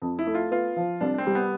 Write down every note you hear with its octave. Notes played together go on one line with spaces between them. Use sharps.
F2
E4
A3
F4
B3 F4
F3
C2 D4
D4
C4
G3
B3